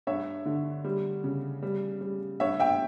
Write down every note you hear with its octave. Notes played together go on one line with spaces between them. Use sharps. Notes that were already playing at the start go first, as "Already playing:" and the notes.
G2 C#5 E5
D3
G3
C#3
G3
G3
G2 C#5 E5
E5 G5